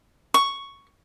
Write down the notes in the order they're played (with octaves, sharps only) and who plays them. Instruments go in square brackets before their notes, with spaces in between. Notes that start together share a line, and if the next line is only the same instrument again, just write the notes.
[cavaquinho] C#6